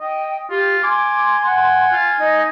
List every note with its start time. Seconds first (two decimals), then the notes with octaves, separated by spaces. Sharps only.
0.01 D#5 G5
0.51 F4 G4
0.83 G#5 C6 D6
1.45 F#5
1.92 F4
2.20 D#4 D#5